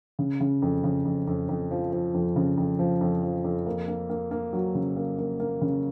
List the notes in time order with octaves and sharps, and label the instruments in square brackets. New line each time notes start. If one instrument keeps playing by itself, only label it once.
[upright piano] C#3
C#3
F2
C#3
F2
F2
F2
F3
F3
F2
C#3
F2
F3
F2
F3
F2
A#3
A#3
A#3
A#3
F#3
C#3
A#3
A#3
A#3
C#3